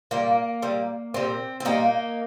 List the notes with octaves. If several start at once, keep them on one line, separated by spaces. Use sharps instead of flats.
A#2 G3 A#3
A#2 G3
A#2 G3 C4
C4
A#2 G3 A#3 D#4